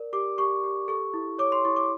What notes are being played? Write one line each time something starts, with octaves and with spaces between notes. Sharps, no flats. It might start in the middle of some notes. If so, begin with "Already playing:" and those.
Already playing: A#4 D5
G4 D6
G4 C#6
G4
A4 C#6
E4
C#5 D6
C6
E4 C#6
D6